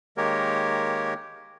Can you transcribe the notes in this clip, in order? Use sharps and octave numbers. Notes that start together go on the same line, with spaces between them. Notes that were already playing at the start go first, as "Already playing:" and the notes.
D#3 G#3 A#3 G4 A#4 C#5